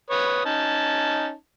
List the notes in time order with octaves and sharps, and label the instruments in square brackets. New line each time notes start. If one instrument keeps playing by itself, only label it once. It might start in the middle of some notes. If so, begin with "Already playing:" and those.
[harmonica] B4 C#5 D#6
C#4 D#4 A5